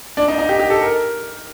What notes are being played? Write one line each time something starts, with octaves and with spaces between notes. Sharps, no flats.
D4
D#4
D#4
G4
G4
A4
A#4